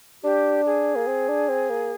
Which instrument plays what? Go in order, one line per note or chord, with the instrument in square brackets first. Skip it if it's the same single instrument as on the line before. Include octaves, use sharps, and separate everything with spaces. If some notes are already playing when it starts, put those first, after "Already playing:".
[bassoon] D4 [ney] G4
[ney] G#4
[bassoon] A#3
C4
D4
C4
A#3